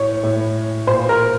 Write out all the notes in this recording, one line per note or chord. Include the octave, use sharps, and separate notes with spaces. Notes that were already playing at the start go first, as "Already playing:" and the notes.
Already playing: A2 C#5
A2
A#2 C5
A#4